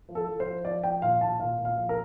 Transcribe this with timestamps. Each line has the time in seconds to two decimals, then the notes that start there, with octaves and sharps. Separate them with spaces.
0.09 F3
0.15 A4
0.27 F3
0.40 C5
0.47 F3
0.65 F3 D5
0.83 F3 G5
1.02 A#2 F5
1.21 A#2 A5
1.40 A#2 F5
1.59 A#2
1.65 F5
1.77 F3
1.89 A#4